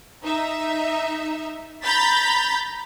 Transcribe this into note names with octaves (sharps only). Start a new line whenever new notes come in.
D#4 E5
A#5 B5 G6 A6 B6